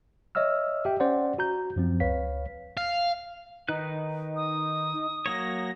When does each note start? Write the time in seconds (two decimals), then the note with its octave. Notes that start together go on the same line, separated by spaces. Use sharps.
0.35 C#5 D#5 E5 E6 F6
0.85 G4 E5 G5
1.00 C#4 C5 D5 F#5
1.38 F#4 A#5 G6
1.76 F#2 F3 C4
2.00 C#2 B4 C#5 F5 B6
2.77 F5
3.69 D#3 D#4 B4 F#6
4.36 D#6
5.26 F#3 A#3 C#5 A#6